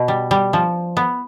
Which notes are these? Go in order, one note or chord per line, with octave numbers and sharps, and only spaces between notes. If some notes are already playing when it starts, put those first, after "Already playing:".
Already playing: B2
G3
G3
F3
B3